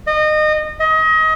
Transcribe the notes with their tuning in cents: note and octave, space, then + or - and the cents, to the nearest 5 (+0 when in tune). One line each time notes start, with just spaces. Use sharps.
D#5 -25
D#5 +30